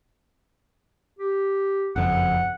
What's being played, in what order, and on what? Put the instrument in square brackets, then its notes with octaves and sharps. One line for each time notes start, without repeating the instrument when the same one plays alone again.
[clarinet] G4
[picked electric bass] F#1 F2 [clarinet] F#5